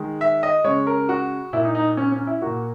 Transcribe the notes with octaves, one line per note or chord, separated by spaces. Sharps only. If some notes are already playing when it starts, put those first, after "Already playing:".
Already playing: D#3 G#3
E5
D#5
C#3 G#3 C#5
A#4
F#4
A#2 A#3 E4
D#4
D#4
C#4
C#4
E4
A#2 A#3 F#4